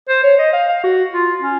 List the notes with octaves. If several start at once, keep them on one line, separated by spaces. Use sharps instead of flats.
C5
C#5
D#5
F5
F5
F#4
F4
C#4